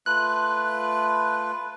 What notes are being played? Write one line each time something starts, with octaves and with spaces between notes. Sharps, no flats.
A3 F4 B4 F#6